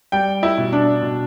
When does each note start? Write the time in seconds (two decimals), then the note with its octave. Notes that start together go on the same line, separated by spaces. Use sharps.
0.12 G3 G5
0.43 E4
0.58 B2
0.73 D4
1.02 B2